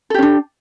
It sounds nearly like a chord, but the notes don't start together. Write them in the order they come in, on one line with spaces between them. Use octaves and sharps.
A4 G4 C#4 D4